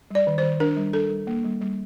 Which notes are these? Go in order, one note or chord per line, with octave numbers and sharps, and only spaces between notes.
G3 D5
D#3
C5
D#3
D4 A#4
G3
D4 A4
G3
A#3
G3
G3